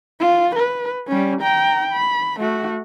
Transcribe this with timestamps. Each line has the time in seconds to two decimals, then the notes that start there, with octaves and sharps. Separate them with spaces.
0.20 F4
0.56 B4
1.07 G3 C#4
1.41 G5 A#5
1.93 B5
2.40 A3 F#4